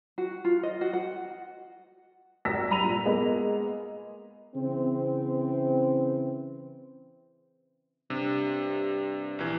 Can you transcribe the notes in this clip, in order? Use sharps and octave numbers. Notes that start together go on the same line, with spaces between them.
F#4
F4
D#5
F#4
F#5
G#1 A#5 E6 A#6 B6
G2 A#5 B5 D#7 F7
A#2
G#3 A#3 B3
C#3 E3 C4
G2 C3
A#1 E3